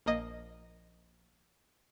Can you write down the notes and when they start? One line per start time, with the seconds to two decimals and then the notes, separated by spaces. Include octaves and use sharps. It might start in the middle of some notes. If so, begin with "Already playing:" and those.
0.06 A#1 A#3 D#5